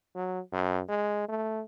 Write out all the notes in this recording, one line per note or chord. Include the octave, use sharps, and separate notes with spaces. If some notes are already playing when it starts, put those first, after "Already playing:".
F#3
F#2
G#3
A3